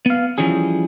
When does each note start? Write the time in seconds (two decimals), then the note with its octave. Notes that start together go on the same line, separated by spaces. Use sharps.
0.06 B3 F5
0.38 E3 F3 G3 C#4 G#4